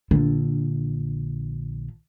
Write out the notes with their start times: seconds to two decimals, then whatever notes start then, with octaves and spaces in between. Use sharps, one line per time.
0.11 A#1 D3